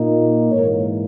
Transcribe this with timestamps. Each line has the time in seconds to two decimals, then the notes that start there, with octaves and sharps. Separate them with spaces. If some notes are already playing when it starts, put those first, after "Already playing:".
Already playing: A#2 A#3 D#4
0.52 G#2 E3 A#3 A#4 C#5